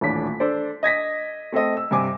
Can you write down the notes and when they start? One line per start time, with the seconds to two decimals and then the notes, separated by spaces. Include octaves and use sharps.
0.01 D#1 A1 D2 D4 B6
0.40 D4 A4 C5 D5
0.83 D#5 G#6 A#6 B6
1.52 A3 C4 A4 D#5
1.77 E6
1.91 G2 C3 G#5 D6